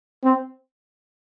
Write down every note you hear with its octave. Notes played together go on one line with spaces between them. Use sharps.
C4